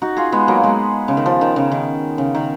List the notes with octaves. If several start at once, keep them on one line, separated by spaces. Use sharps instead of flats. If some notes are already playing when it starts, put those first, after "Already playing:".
D#4 F#4
F4 G#4
G#3 B3
F#3 A#3
G#3 B3
C#3
D#3
F3
D#3
C#3
D#3
C#3
D#3